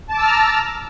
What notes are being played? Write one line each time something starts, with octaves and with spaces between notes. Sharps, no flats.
A5 A#5 D6 E6 F6